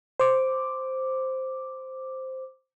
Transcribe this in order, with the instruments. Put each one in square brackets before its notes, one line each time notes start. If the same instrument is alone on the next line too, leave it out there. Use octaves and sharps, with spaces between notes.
[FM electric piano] C5 D6